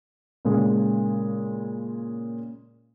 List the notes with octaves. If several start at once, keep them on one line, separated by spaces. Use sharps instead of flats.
A#2 C#3 G#3